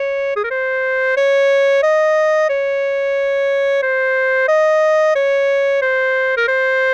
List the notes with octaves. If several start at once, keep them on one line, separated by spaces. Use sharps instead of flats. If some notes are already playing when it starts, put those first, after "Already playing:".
Already playing: C#5
G#4
A#4
C5
C#5
D#5
C#5
C5
D#5
C#5
C5
A#4
C5